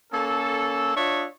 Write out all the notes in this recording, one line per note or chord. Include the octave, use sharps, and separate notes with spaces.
A#3 C#4 A4
D4 F4 C#5 D#5 E5